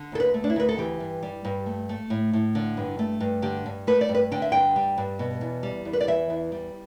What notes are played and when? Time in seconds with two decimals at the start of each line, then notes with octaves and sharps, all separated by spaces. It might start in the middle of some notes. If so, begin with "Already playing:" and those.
Already playing: D3
0.12 D2 A4
0.20 B4
0.34 A3
0.44 D4
0.50 E4
0.56 D2 B4
0.69 A4
0.78 E3 G4
1.00 G2
1.23 G3
1.45 G2
1.66 A3
1.89 A3
2.10 A2
2.33 A2
2.55 D3
2.77 G2
2.99 A3
3.20 G2
3.42 D3 G4
3.66 G2
3.87 A3 B4
4.01 D5
4.09 G2
4.15 B4
4.31 D3 G5
4.42 E5
4.52 G2 G5
4.76 G3
4.98 G2
5.19 B2
5.41 E2
5.63 G3
5.85 E2
5.93 B4
6.00 D5
6.08 E3 E5
6.30 E2
6.52 G3